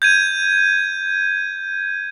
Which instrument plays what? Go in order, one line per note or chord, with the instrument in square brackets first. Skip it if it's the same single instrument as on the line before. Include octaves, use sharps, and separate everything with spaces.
[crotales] G6 G#6 D#7